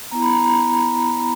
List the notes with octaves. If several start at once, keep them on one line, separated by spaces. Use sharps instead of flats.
B3 E4 A#5
B5
A#5